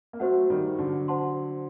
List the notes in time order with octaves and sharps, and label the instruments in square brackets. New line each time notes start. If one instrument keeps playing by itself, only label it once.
[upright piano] A#3
[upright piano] F#3 A3 [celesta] F#4 C5 F#5
[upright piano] D#3 G3
D3 F#3
[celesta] C5 F#5 A5 C6